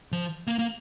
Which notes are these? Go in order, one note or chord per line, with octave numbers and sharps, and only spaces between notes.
F3
A#3
A#3